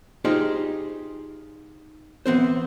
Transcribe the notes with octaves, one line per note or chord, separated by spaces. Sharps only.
D#4 F4 G4 G#4 C5
E3 B3 C4 C5